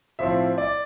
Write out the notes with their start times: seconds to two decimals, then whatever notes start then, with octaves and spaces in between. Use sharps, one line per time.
0.19 A2 F3 C4 E5
0.58 D5